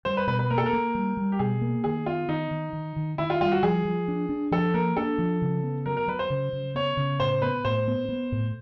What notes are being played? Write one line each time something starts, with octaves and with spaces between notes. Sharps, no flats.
G3 C5
B4
B2 B4
B4
A#3 A#4
A4
A#4
A#3
G3
G3
G4
B2 G#4
A#3
D#3 G#4
B3 F4
D#3 D#4
D#3
D#3
D#3
D#3 E4
F4
G3 F4
F#4
F3 G#4
F3
D4
D4
F3 A4
A#3 A#4
D4 A4
F3
C#3
B3
F#3 A#4
A#4
F#3 B4
C5
C#3
C#3
B3 C#5
C#3
A2 C5
B3 B4
A2 C5
B3
B3
A2